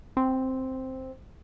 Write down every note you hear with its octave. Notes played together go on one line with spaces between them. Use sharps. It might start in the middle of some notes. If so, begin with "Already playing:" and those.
C4